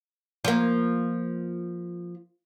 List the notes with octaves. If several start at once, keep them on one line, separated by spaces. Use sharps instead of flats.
F3 A#3